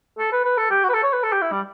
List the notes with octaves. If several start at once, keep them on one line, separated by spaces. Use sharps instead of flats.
A4
B4
B4
A4
G4
F#4
B4
A4
C#5
B4
A4
G4
E4
G3